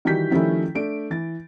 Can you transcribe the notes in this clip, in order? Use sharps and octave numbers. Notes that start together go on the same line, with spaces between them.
D#3 E3 G3 F#4 G6 B6
D#3 F3 G3 A3 C#4 E4
A3 D4 D7
E3 A6